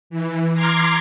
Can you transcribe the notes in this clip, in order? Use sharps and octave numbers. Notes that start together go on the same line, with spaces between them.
E3
A#5 C6 D6 F6 G#6 C7